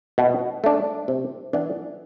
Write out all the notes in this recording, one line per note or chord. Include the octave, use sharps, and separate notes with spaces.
B2
A3 D4
C3
E3 B3 D4